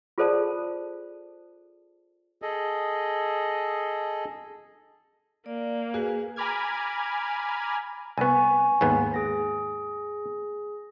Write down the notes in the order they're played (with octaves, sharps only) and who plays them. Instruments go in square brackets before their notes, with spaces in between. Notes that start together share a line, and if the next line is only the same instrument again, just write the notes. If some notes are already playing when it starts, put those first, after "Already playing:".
[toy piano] F4 G#4 A4 C5 D5 A5
[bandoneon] G#4 A4 D#5
[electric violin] A#3 [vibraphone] D5
[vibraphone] F#4 B4 [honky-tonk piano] G#4
[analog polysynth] G#5 A#5 B5 D6 F6 G#6
[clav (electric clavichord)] C2 B3 [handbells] G#5 C#6
[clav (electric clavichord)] D#2 G#2 B3
[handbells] G#4 A#6